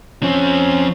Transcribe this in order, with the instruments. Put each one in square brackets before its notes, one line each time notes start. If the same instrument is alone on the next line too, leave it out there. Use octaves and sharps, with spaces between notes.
[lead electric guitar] F3 C4 [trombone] C#4